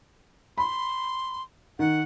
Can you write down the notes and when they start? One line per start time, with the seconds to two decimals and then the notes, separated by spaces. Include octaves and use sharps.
0.58 B5 C6
1.79 D#3 F#5